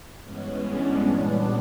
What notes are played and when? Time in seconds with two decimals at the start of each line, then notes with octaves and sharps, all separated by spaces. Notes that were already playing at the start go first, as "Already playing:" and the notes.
0.20 G2 E3 G#3 B3 C#4
0.62 D4
1.03 A#2 G3 B3 D4